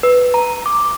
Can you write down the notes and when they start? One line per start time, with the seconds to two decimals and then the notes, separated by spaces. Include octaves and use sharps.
0.03 B4
0.34 A#5
0.66 D6